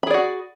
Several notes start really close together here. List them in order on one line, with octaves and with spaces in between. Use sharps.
B5 G#4 D5 F#4